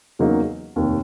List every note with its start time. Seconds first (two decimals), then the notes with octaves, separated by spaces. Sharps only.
0.19 E2 C#3 F#3 A#3 D#4
0.76 F1 D#2 D#3